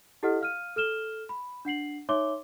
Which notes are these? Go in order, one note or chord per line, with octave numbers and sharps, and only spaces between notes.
E4 G4 A4 D#5 F#5 F6
F5 F6 D#7
A4 F6 E7 G7
B5
D4 F#5 C7 F#7
D#4 C#5 E5 C6 D6 G7